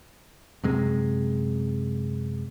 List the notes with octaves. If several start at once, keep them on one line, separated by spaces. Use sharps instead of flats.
F#2 C3 G#3